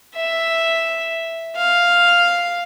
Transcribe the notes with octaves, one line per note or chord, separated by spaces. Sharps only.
E5
F5